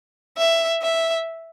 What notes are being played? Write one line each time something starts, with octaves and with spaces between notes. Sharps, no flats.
E5
E5